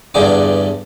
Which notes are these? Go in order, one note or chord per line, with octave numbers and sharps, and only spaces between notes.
E2 G2 D3 G#4 G5 D6